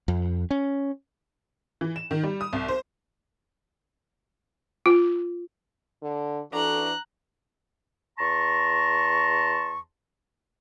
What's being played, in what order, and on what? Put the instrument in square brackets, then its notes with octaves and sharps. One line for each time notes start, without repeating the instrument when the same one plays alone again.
[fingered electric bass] F2
C#4
[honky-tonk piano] E3
E7
D#3
G3
D#6
C2
C5
[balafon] F4
[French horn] D3
[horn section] E3 D4 F#4 [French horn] A4 [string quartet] A#5 F#6
[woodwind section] E2 A5 A#5 C6 C#6